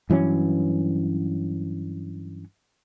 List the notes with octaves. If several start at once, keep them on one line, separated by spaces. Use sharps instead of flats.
G2 E3 F#3 C#4